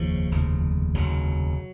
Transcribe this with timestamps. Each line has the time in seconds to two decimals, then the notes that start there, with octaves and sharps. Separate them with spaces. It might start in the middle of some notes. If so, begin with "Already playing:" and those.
Already playing: F1 D#2 C#3 F3
0.31 F1 D#2 C#3
0.94 F1 D#2 C#3 F#3